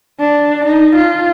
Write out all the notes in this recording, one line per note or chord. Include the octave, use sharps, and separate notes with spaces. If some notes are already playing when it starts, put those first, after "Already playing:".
D4
D#4
F4